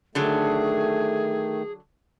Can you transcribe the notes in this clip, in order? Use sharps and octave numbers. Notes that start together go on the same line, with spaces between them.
D3 D#3 F#3 A3 G#4